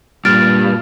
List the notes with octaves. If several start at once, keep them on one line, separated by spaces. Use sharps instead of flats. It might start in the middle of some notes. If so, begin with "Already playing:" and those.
G2 A#2 F6 A6 D7